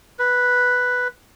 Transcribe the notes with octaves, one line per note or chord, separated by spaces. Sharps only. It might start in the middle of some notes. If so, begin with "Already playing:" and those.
B4